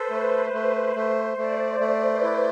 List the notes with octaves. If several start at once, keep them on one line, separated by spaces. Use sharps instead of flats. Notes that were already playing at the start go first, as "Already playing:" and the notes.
Already playing: A4 B4 C5
A3 B4
A3 C5
A3 C5
A3 D5
A3 C5
B4
E4